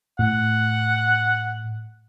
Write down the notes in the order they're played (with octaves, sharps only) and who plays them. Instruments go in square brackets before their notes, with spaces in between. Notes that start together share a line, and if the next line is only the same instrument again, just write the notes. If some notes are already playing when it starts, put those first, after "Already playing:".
[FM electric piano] A2 [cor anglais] F#5